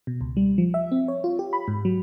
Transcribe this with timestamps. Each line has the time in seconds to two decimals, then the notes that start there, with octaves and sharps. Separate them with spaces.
0.07 B2
0.21 C#2
0.37 G3
0.58 F3
0.74 E5
0.92 C4
1.08 C#5
1.24 F4
1.39 G4
1.53 B5
1.68 G#2
1.85 F#3